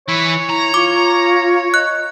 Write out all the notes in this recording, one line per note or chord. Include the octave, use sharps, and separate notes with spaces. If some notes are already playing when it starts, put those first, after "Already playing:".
E3 E4 C#5
E4 A#5
F4 D6
D#5 F#6